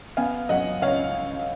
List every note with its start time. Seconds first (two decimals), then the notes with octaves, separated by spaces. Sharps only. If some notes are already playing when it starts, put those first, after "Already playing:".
0.17 B3 F5 G#5
0.49 F#3 D#5 F#5
0.82 C#2 C#5 F5